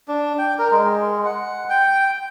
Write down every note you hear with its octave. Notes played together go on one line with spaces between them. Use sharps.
D4
G5
A#4
G#3
F#5
G5